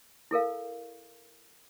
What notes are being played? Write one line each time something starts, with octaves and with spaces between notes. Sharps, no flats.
E4 A4 A#4 F5